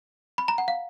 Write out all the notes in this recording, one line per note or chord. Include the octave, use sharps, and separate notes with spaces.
B5
A#5
F#5
F5